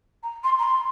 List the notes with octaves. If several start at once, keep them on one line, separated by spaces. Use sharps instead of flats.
A#5
C6
A#5
C6